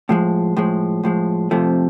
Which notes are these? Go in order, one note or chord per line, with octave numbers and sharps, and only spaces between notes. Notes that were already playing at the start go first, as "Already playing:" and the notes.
A2 F3 G#3
A2 F3 G#3
A2 F3 G#3
F2 C3 F3 A3